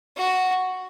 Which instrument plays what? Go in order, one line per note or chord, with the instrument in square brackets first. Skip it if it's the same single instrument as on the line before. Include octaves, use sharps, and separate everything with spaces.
[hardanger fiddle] F#4